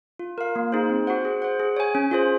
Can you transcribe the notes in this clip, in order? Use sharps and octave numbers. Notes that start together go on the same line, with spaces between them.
F4
A#4 F5
A#3
D#4 G#4 C5
C4
F#4 C5 F#5
G#4
C5 F#5
G#4
C#5 G#5
C#4
F4 G#4 C5